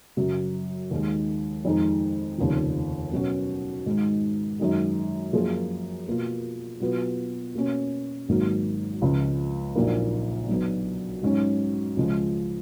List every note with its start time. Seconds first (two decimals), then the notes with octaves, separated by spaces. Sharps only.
0.17 F#2 C#3 F#3
0.91 D#2 D#3 G#3
1.65 F2 D#3 G#3 D#4
2.38 F1 D#2 C#3 F3
3.12 B2 F#3 C#4 F#4
3.86 G#2 D#3 G#3
4.59 F#2 D#3 G#3
5.33 F#2 F3 A#3 F4 G#4
6.07 B2 A#3 F4
6.80 B2 F#3 B3 F4
7.54 B2 A#3 C#4
8.28 G#1 G#2 F#3 A#3
9.02 C#2 C#3 F3
9.75 A#1 A#2 F#3 A#3 D#4
10.48 B1 B2 F#3
11.23 G#2 F#3 C#4 F#4
11.96 C#2 C#3 F3 G#3